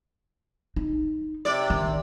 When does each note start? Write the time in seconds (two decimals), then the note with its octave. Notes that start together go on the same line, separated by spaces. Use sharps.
0.76 D#4
1.45 C3 D5
1.70 D#3